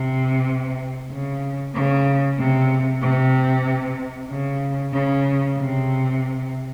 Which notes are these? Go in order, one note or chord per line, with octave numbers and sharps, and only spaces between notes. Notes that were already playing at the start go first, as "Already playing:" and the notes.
Already playing: C3
C#3
C#3
C3
C3
C#3
C#3
C3